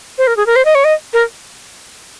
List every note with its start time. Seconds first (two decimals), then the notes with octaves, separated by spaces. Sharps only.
0.18 C5
0.27 A#4
0.37 G#4
0.47 A#4
0.56 C5
0.65 D#5
0.75 C#5
0.85 D#5
1.13 A#4